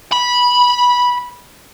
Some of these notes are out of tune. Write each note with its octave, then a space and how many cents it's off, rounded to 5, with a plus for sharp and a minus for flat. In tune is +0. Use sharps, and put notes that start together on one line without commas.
B5 -15